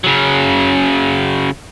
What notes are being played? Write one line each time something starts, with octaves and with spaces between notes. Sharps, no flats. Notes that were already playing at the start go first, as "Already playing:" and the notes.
C#3 F#3